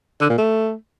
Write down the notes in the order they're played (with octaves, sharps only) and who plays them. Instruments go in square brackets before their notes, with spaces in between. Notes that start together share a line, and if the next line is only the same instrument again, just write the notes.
[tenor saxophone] D3
A#2
A3